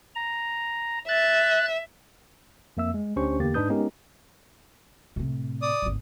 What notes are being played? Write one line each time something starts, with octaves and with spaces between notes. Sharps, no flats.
A#5
E5 F#6 A6
F2 A#3 E5 E6
G#3
D2 C#4 D4 G4 C5 C#6
E2 D3 A#3 G4 A6
G#2 D4 D#4 B4 D#6 G6
G#3 B3 C#4 D#4 G4 A#4
A2 C3
D5 D#6
G#1 D2